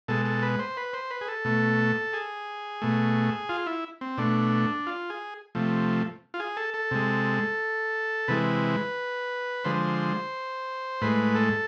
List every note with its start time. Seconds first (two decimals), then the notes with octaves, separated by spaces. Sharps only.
0.08 B2 G#3 A4
0.25 A4
0.43 B4
0.59 C5
0.77 B4
0.93 C5
1.11 B4
1.21 G#4
1.28 A4
1.45 B2 A3
2.13 G#4
2.82 B2 A3
3.49 F4
3.66 E4
4.01 C4
4.18 B2 A3 D4
4.87 F4
5.10 G#4
5.55 C3 F3 A3
6.34 F4
6.40 G#4
6.57 A4
6.74 A4
6.91 C3 G#3
8.28 C3 E3 G#3 B4
9.64 D3 F3 G#3 C5
11.01 A2 G#3 B4
11.35 A4